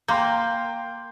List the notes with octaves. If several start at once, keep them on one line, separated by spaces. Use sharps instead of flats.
A#3 G5 C6 G6